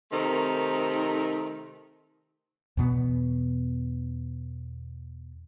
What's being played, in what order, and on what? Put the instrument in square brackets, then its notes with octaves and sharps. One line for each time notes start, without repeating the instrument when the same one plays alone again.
[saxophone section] C3 D#3 A3 D#4 A#4 C5
[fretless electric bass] E2 B2 B3